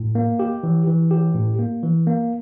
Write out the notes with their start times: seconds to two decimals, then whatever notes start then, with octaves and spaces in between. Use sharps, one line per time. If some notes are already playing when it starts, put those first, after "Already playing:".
Already playing: A2
0.15 A#3
0.39 G4
0.63 E3
0.87 E3
1.11 G4
1.35 A2
1.59 A#3
1.83 E3
2.07 A#3